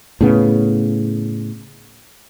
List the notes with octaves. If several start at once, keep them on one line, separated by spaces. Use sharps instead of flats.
A2 C#3 B3